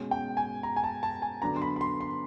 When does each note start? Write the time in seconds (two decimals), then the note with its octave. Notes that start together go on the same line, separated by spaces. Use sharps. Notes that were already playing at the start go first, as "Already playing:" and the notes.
Already playing: B2 G#3 C#4
0.11 G5
0.37 G#5
0.63 A#5
0.76 G#5
0.84 A5
1.03 A5
1.22 G#5
1.42 D3 F#3 B3 D4 A#5
1.56 C6
1.62 B5
1.76 B5
1.81 C6
2.01 C6